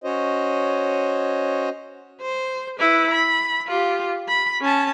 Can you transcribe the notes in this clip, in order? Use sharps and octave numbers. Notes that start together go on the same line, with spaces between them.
C#4 F#4 C5 C#5 D#5
C5
E4 B4
B5
F4 G4
B5
C#4 A5